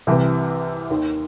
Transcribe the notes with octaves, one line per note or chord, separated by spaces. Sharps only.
C2 C3 E3
D#2 D#3